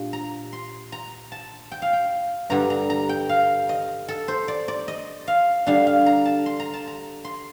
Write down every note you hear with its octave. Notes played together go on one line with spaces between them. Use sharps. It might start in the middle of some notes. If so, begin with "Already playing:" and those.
Already playing: A#2 G3 D4
A#5
C6
A#5
A5
G5
F5
G5
G2 D3 G3 A#5
A#5
A#5
G5
F5
D#5
A4
C5
D5
D5
D#5
F5
D3 G3 D4 F5
F5
A#5
A5
C6
A#5
A5
A#5
C6